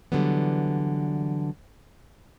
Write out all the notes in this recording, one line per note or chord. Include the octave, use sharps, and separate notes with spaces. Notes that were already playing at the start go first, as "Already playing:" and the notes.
D3 E3 F#3 G3 B3